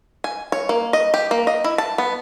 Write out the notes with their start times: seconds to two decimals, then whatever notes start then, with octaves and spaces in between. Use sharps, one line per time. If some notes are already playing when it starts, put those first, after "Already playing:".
0.24 G#5
0.52 C#5
0.69 A#3
0.93 D#5
1.14 G4
1.31 A#3
1.47 D#5
1.64 E4
1.78 A5
1.98 B3